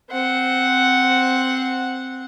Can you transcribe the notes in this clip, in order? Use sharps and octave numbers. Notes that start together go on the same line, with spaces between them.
C4 F#5